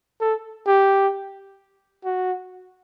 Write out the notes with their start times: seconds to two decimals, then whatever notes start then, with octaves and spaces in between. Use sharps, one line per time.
0.20 A4
0.67 G4
2.04 F#4